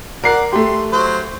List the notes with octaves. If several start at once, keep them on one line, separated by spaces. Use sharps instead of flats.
A#4 D5 F#5 C7
A3 G4 C6
F#3 C5